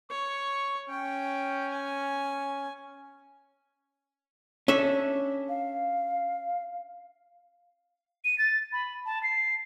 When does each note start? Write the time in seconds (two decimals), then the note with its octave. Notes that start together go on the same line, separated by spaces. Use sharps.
0.10 C#5 C#6
0.89 C#4 G5
1.71 G#5
4.68 C#4 D4 A4 E5
5.49 F5
8.25 D#7
8.38 A6
8.73 B5
9.06 A5
9.23 C7